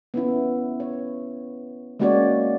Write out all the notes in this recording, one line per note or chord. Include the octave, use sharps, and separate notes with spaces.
B3 C#4 E4
C#5
G#3 A#3 C#4 F#4 C#5 D5